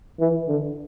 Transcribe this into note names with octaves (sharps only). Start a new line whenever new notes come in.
E3
D3